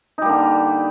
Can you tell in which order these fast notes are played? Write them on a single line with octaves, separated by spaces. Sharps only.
D#4 G3 A#3 D3